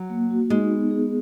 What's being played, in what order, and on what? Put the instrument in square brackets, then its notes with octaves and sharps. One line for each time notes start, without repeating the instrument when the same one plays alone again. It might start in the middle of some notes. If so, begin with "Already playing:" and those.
Already playing: [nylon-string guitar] F#3
[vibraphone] A#3
F#4
[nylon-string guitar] G#3 [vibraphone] D#4
[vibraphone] B3
G#4